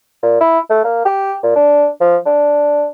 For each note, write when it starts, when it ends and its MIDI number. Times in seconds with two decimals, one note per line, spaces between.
0.23 0.40 46
0.41 0.59 64
0.70 0.80 57
0.84 1.02 58
1.05 1.34 67
1.43 1.52 46
1.56 1.87 62
2.01 2.16 53
2.26 2.87 62